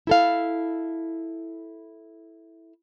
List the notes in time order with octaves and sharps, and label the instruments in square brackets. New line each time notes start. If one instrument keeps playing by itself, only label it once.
[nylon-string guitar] E4 A4 F5